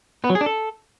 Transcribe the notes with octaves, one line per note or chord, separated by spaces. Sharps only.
B3
F#3
G#4
D4
A4